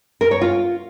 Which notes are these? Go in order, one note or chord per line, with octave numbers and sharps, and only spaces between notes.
A#4
C#5
F4